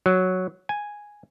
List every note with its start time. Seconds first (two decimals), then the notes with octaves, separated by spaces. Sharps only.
0.06 F#3
0.69 G#5